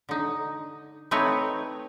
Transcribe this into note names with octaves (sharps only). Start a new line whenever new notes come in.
D3 D#4
A3 C4 D#4 B4 C#5